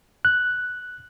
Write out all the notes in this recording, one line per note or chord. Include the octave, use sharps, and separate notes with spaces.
F#6